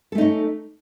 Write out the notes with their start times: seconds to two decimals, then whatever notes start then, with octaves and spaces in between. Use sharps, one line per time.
0.12 A4
0.15 A3
0.18 D#4
0.21 C#4